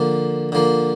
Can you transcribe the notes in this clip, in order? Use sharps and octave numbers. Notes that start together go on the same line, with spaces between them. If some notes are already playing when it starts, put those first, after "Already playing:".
Already playing: D3 F3 A#3
D3 F3 A#3